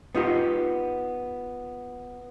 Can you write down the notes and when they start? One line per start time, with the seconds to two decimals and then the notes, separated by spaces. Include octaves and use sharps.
0.15 B3 D#4 F4 G4